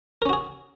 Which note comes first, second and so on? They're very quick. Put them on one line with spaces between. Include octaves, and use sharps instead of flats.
A#4 C#4 F#4 G#4